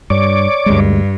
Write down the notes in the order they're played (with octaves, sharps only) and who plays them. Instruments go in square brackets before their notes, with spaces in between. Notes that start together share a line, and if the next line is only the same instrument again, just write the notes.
[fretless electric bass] G2 [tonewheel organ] C#5 D5 D6
[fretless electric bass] D2 G#3 [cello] G2